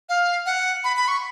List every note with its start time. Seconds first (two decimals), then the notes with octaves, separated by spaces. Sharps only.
0.09 F5
0.46 F#5
0.84 B5
0.97 B5
1.08 C#6